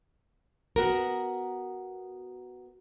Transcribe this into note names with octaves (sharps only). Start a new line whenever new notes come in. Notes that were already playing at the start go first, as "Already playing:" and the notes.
B3 F#4 A#4